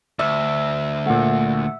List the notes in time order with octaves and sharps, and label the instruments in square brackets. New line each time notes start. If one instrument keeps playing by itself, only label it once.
[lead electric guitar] D2 [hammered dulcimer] E5
[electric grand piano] A#2 A3 [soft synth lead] F#5